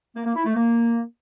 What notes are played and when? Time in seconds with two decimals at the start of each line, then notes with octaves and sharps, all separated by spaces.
0.15 A#3
0.25 A#3
0.35 E4
0.45 A3
0.55 A#3